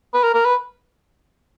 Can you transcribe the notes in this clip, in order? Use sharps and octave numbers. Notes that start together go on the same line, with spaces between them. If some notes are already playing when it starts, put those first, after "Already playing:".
B4
A#4
A#4
B4